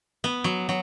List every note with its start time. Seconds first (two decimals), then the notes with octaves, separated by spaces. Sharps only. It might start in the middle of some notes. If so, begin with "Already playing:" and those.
0.24 B3
0.44 F#3
0.69 F#3